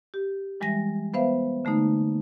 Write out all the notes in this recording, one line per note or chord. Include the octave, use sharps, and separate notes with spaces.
G4
E3 G3 G#3 E5 A#6
B3 B4 C5 E5 F5
D3 A3 A#3 D#4